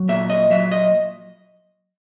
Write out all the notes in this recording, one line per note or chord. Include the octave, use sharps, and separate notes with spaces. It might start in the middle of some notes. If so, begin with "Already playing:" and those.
Already playing: F#3
A#2 E5
D#5
F#3 E5
D#5